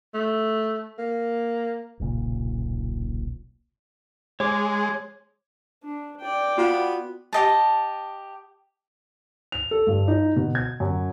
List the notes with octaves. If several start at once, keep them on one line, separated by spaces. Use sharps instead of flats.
A3
A#3
D#1 B1 A#2 C#3
G#3 C#5 D6
D4
D5 G5
B3 F4 F#4
G4 D#5 A5
F7
A4
G2
D#4
B2
G#6
F#2